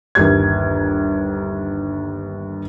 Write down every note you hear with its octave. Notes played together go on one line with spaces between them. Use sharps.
G1 D#2 G4 G#6